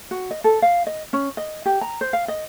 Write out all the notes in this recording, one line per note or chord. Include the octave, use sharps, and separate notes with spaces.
F#4
D#5
A4
F5
D#5
C#4
D#5
G4
A#5
C5
F5
D#5